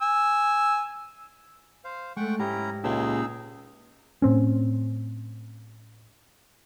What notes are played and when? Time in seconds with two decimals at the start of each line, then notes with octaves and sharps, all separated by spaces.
0.02 G#5 E6
1.84 C5 F5
2.17 G#3 A3 F#5 G5 C#6
2.39 G#2 C#4 E4 G4 G5 A#5
2.84 C#2 A#2 C#4 D#4 G4 G#4 E6
4.22 A2 C4 C#4